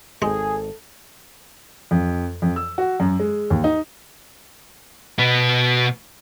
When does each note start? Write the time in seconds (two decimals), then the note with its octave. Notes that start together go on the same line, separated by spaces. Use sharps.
0.22 G#1 G#3 G#4 A4 D#5 G5
1.91 F2
2.42 F2
2.56 E6
2.78 F#4
3.00 F#2
3.20 G#3
3.50 D#2
3.64 D#4
5.19 B2 B3